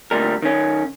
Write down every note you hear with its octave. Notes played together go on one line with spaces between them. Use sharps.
D2 A#2 G3 A#4
D#3 C#4